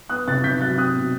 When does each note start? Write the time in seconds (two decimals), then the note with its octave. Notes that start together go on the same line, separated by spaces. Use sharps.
0.09 B3 D#6 F#6
0.28 C3 F#6 A6
0.44 C3 G6 B6
0.60 F#3 F#6 A6
0.77 C4 D#6 F#6
0.95 B2